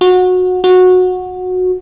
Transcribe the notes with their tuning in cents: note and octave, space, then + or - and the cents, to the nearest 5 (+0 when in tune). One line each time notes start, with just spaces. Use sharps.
F#4 -20
F#4 -15